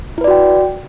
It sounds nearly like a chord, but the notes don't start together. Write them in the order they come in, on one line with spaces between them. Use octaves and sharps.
E4 B4 D5 F#4 G5